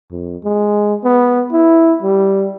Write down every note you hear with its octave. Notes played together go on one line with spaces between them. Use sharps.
F2
G#3
B3
E4
G3